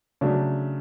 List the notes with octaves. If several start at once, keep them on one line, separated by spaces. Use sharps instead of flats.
C#3 F#3 A3 D4